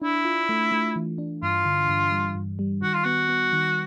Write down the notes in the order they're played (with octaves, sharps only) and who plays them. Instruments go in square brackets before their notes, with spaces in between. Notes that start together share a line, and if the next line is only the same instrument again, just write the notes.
[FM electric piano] D4 [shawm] E4
[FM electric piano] F4
A3
A3
E3
D4
[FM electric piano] G2 [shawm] F4
[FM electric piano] D3
G2
G3
G2
G3
[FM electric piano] D#3 [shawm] F#4
[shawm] F4
[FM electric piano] B3 [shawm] F#4
[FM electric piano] B3
D#3